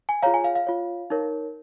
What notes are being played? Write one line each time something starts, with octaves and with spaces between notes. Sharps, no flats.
G#5
F4 G#4 C#5 F5 A#5
G#5
F5
F5
F4 C#5
D#4 A#4 C#5